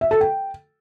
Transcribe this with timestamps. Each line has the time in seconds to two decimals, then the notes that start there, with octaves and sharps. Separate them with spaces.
0.01 E5
0.11 A4
0.21 G5